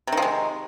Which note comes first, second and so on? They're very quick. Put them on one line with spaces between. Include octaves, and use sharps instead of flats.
C3 D#3 F3 G#3